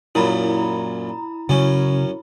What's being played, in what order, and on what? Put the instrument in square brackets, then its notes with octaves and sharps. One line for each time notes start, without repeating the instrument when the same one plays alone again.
[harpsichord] F#2 A#2 [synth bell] E4 A#5 B5
[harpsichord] F#2 C#4 [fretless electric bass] C#3